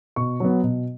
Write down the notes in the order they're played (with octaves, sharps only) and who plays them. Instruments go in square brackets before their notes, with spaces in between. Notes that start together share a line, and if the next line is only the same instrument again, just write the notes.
[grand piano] B2 C#6
F#3 B3
B2